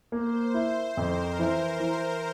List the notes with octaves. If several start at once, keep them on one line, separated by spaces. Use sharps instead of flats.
A#3 C5
E4
F2 A#4
E3
E3